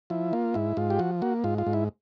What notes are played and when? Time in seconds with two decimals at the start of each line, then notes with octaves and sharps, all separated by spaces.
0.10 F3 E4
0.33 A#3 F4
0.54 G#2 E4
0.77 G#2 F4
0.90 G4
0.99 F3 F#4
1.22 A#3 F#4
1.44 G#2 F4
1.58 F4
1.67 G#2
1.73 E4